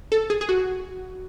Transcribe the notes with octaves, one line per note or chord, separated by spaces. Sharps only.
A4
G#4
G#4
F#4